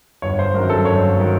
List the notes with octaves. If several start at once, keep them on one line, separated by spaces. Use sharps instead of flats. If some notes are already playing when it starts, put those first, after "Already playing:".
G1 C#5
C5
F#2 D#3 F#3 A#4
A4
G1 C#5
D#3 F#3